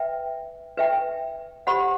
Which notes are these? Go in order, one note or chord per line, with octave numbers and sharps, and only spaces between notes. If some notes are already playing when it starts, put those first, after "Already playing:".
Already playing: B4 E5 G5
B4 E5 G5
G4 C5 F#5 B5